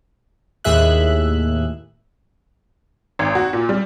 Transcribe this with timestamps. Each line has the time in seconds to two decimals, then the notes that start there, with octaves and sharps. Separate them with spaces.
0.64 D#2 A2 G#4 E5 F#6
3.19 G#1
3.35 F#4
3.53 A#2
3.69 G3